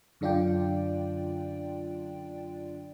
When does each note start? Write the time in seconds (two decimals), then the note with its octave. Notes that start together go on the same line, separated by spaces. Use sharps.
0.21 F#2 D3 D4 F4 D5 G5